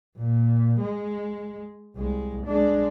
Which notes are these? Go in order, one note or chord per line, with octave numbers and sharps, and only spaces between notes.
A#2
G#3
C2 G#3
G#3 D4